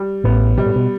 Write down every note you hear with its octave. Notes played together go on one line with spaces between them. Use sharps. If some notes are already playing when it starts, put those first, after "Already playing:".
Already playing: G3
A1 A2 B3
B2 G3
A2
B2